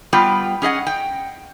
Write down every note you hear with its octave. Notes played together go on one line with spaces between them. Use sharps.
G3 B3 F4 G5
C#4 G#4 D#5 F#5
G5